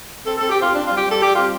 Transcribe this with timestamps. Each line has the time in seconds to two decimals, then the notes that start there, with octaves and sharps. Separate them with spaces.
0.24 C4 A4
0.37 C4 A4
0.49 G4
0.57 C4 F4
0.72 C4 D4
0.85 G3 F4
0.97 G4
1.04 G3 A4
1.21 G3 G4
1.33 C4 F4